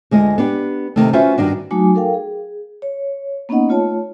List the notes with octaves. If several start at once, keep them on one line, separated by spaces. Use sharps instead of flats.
D2 G#3 F4 D#5
B3 D4 G4
C3 D#3 A3
C#4 F4 F#4 B4 C5 E5
G2 D#3 D4 F#4
F#3 A3 D#4 F#4 G#5 D6
A4 A#4 F5 G5
G#4
C#5
A#3 B3 C#4 D#4 D#5 F#5
A3 F4 C#5 A5